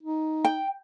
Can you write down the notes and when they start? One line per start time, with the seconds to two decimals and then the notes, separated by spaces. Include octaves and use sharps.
0.03 D#4
0.45 G5